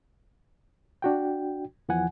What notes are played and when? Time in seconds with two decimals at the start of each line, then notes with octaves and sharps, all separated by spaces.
1.02 D4 F#4 G5
1.89 E2 E3 F3 F#5 G#5